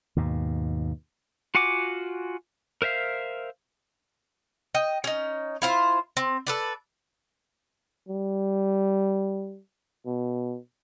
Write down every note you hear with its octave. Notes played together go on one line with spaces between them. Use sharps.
D#2 G#2 B2
F4 F#4 F#5 G#5 D6
A#4 C5 E5 F5
D#5 G5
C#4 D#4
E4 F4 C5
C4
A4 B4 D5
G3
B2